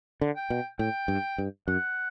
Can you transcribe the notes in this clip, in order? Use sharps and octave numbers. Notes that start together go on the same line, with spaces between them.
D3
G5
B2
A2 G5
G2
G2
F#2 F#5